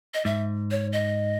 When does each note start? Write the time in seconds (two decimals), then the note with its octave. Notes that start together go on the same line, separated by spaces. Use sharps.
0.14 D#5
0.25 G#2 E5
0.71 C#5
0.93 D#5